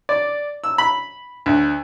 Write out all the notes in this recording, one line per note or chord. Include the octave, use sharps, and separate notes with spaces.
D5
E6
B5
D2